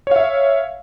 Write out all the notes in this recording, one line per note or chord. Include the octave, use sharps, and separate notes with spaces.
C#5 E5 F5